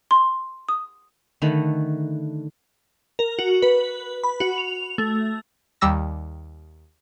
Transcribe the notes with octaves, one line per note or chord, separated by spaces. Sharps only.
C6
D#6
D3 D#3 A3 B4
A#4
F#4
B4
B5
F#4
F7
A3
D#2 G3 E6 A#6